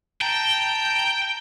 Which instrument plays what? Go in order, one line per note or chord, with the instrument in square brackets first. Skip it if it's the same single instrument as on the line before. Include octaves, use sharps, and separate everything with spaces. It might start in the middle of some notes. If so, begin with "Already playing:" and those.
[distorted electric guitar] G5 [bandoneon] A5 A#5